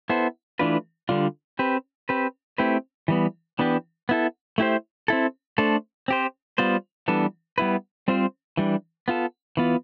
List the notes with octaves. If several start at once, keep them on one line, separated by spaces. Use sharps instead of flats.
B3 E4 A4 C5
E3 A3 D4 F4 B4
D3 G3 D4 F4
C4 G4 B4
C4 G4 B4
A3 C4 E4 G4 B4
E3 G3 B3
E3 B3 D4 G4
B3 E4 A4
A3 E4 G4 C5
C4 E4 A4
A3 D4 A4 C5
C4 G4 C5
G3 B3 F4 C5
E3 G3 B3 D4 A4
G3 B3 E4 B4
G3 C4 F4 C5
E3 G3 D4
B3 F4 A4
E3 B3 F4